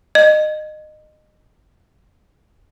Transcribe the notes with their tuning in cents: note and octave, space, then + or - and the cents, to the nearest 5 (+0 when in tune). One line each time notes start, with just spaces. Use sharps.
D#5 -20